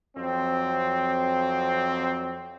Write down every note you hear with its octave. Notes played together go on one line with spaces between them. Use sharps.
F2 F#3 C4